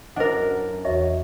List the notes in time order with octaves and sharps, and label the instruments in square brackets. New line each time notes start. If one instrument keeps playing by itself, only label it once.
[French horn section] F#2 [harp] D4 A#4 [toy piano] C5 D#5 F#5
[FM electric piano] E2 C#5 [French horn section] F#4 [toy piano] D#5 E5